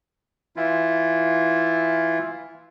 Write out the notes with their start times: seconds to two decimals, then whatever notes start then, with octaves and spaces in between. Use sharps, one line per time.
0.56 E3 E4 F4